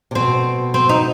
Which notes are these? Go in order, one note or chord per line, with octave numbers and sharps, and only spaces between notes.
C3
B2 C4
C4
D#4